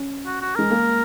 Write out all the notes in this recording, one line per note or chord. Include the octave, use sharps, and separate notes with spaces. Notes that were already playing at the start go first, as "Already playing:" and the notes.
Already playing: C#4
F#4
F#4
G#3 A#4
A#3